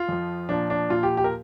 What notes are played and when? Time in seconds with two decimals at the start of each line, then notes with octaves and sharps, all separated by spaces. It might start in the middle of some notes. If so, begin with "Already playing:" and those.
Already playing: F4
0.08 F2 F3
0.49 A#2 F3 D4
0.70 D4
0.90 A#2 F3 F4
1.03 G4
1.17 G4
1.24 A#4